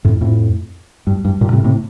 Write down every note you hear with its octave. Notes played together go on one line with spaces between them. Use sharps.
F2 A2
F2 A2
G2
G2
G2 A#2
A2 C3
A2 C3